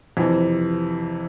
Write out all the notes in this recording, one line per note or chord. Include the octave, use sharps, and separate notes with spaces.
F2 C3 E3